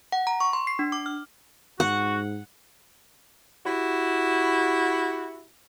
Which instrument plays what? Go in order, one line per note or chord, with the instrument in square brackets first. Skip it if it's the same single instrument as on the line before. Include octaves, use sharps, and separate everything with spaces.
[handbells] F#5
A#5
C#6
C6
C7
D4
D6
F6
[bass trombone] G#2 [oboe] F#4 [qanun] F#5
[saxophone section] E4 F#4 G4